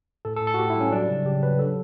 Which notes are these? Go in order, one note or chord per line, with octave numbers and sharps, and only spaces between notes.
A2 A4
A4
A2
A4
F#4
A2 G4
E4
G3 C#4
F#3 D4
C#3
C#3 G4
F#3 B4
F#3 A4